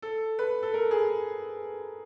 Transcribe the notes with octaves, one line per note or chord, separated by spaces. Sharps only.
A4
B4
A4
A#4
G#4